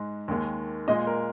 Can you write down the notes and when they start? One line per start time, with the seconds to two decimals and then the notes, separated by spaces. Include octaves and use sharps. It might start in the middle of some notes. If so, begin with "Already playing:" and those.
Already playing: G#2 G#3
0.28 D#2 D#3 G#3
0.88 A#2 G#3 D#5
1.07 A#4